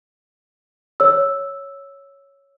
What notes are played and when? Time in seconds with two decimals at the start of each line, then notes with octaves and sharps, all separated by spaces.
1.00 C#5 E6